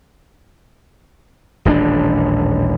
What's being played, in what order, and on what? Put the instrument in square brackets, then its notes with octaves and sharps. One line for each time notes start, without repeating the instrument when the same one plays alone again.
[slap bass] D#1 A1 C#4 D4